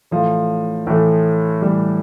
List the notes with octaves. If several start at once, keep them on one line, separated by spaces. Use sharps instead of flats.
A2 E3 F3 A3
A2 E3 A3
A2 E3 G3 A3